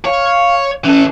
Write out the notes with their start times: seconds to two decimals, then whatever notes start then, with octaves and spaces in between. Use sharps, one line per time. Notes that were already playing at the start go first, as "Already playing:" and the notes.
0.05 C#5 F5
0.85 E3 C#4 A4